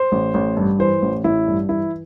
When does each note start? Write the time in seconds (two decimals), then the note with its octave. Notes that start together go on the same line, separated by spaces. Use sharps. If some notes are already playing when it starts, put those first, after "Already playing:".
Already playing: C5
0.12 A1
0.34 A1
0.57 G2
0.79 E3 C5
1.02 A1
1.24 A1 E4
1.47 G2
1.69 E3 E4